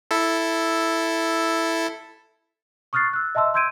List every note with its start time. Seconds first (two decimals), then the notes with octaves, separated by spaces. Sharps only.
0.11 E4 A4
2.93 C#6 D#6 F6 F#6 A6 C7
3.13 E6 F#6
3.35 D#5 E5 A5 C6 E6
3.54 C6 E6 G6 G#6 D7 D#7